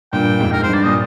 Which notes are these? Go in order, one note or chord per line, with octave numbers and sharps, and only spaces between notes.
G2 A#2 G5
F2 G#2
A#4
C5
G2
D5
A#2 D#5